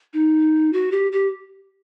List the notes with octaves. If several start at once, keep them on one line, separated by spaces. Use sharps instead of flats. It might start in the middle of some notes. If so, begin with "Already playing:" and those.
D#4
F#4
G4
G4